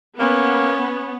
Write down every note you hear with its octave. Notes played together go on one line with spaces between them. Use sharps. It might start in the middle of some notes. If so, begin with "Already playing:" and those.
A#3 B3 C#4